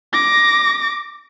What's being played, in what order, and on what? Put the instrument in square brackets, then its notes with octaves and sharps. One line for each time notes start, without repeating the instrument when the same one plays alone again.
[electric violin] D6 A#6